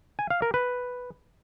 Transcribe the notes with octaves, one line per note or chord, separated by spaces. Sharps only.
G#5
F5
A#4
B4